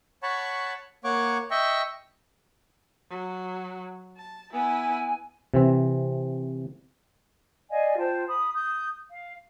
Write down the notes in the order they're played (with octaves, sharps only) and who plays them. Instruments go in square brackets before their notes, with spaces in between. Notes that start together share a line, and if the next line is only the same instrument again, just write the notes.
[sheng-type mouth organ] C#5 F#5 A5 B5 C#6
A#3 C#5 F#5 C#6 D6
D#5 E5 G5 C#6
[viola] F#3
A5
[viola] B3 E4 [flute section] G#5
[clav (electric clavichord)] C3 E3 C4
[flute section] D5 D#5 F5 G#5
F4 C5 G5 A5
B5 D#6
D#6 G6
F5